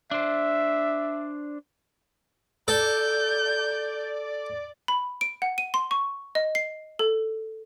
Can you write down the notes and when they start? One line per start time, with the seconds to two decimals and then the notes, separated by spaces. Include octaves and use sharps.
0.11 D4 C5 E5
2.68 A4 D5 G6
4.88 B5
5.21 D7
5.42 F#5
5.58 D#7
5.74 C6
5.91 C#6
6.35 D#5
6.55 C7
6.99 A4